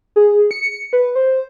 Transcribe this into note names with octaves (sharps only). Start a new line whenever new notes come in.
G#4
C#7
B4
C5